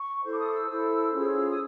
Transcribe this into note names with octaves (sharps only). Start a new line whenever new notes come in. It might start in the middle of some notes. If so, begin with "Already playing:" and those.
Already playing: C#6
E4 A4 C5
D6
D#6
E6
E4 A4 C5
C#4 F4 G#4 C#5
D#6